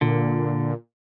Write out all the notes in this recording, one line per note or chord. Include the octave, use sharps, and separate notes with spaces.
A#2 D3